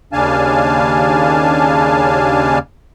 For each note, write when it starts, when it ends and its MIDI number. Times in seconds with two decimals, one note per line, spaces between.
0.13 2.59 39
0.13 2.59 49
0.13 2.59 62
0.13 2.59 77
0.13 2.59 80
0.13 2.59 81